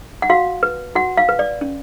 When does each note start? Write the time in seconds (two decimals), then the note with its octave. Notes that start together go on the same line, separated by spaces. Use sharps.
0.22 F#5
0.30 F#4 F5
0.63 B4
0.95 F#4 F#5
1.17 F5
1.29 B4
1.39 D5
1.61 C#4